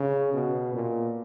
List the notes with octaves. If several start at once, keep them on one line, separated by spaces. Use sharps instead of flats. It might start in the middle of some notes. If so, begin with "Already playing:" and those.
Already playing: C#3
B2
A#2